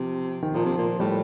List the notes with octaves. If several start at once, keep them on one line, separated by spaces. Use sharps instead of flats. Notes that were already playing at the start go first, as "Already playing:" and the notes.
Already playing: C3 F3
D#3
A#2 F3
C3
A#2
A2 G3